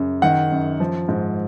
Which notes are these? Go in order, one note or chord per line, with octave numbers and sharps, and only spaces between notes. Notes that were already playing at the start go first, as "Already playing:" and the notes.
Already playing: F#2 C#3
D#3 F#5
F#2
F3
G#2